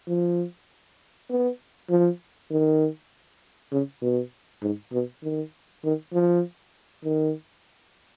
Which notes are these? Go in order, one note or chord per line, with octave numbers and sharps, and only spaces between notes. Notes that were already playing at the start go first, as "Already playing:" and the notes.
F3
B3
F3
D#3
C#3
B2
G#2
B2
D#3
D#3
F3
D#3